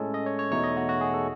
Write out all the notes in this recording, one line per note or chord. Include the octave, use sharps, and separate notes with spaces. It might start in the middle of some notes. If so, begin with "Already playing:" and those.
Already playing: A2 G#3 C#4 A4
D#5
C#5
C#5
E2 B2 A3 D#4 C#5
D#5
F#4
F#4
G#4
A4